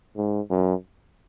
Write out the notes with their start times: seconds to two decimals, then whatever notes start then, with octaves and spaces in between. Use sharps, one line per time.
0.17 G#2
0.50 F#2